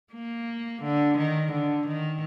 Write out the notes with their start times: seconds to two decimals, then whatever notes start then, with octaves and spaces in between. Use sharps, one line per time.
0.13 A#3
0.83 D3
1.18 D#3
1.53 D3
1.87 D#3